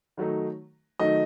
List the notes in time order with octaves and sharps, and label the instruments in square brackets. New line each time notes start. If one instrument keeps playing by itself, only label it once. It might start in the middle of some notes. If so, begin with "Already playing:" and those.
[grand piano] D#3 F#3 A3 D#4
D#3 F#3 A3 D#4 D#5